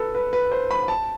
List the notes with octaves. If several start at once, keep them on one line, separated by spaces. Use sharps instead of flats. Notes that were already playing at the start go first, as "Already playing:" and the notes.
Already playing: A4 B4
B4
B4
C5
B5
A5